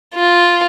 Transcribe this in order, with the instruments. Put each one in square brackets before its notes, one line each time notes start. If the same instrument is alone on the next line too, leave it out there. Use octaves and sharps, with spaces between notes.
[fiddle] F4